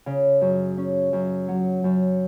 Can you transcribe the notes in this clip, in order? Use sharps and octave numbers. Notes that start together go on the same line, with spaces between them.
C#3
F#2
C#4
F#2
F#3
F#2